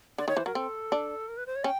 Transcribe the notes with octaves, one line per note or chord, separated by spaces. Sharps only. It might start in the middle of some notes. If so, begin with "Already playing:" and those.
D3 D5
D#3 C#5
E3 C5
F#3 A#4
C4 A4
D4
A#4
B4
C5
C#5
C#4 G5